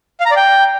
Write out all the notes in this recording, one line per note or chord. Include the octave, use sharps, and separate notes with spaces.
F5
A#5
D5
G5